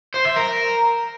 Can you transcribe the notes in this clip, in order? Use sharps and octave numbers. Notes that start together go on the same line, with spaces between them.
C5
E5
A#4